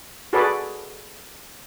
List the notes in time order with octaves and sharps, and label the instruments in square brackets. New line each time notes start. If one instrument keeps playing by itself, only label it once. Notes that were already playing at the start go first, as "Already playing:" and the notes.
[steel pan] F#4 G#4 A4 B4 D5